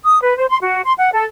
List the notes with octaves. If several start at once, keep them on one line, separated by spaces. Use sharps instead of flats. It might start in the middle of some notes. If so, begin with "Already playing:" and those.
D#6
B4
C5
C6
F#4
C6
F#5
A4